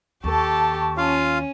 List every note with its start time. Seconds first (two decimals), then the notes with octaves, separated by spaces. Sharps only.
0.24 D#2 G4 A4 A5 C#6
0.98 C#4 F4 F5